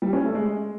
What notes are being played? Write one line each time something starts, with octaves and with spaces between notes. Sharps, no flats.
G3
C#4
A3
G#3